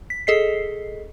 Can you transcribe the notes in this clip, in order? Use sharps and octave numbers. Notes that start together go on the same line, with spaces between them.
B6
G#4 A4 D#5 B6 C7